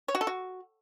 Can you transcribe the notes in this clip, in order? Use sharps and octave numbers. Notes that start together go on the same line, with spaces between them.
C#5
F#4
A4
F#4